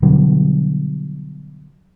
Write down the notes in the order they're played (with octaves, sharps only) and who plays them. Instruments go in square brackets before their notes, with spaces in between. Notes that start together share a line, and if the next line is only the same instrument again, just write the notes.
[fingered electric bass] B2 D3 F#3 G3